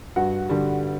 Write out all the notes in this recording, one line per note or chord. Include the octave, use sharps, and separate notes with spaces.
G2 F#4 F#5
D3 G3